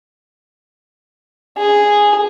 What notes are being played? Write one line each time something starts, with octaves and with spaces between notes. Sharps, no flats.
G#4